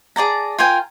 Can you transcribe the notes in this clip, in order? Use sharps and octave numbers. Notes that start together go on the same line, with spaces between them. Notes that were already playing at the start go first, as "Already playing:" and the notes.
G#4 D5 A5 A#5
F4 A#4 G5 G#5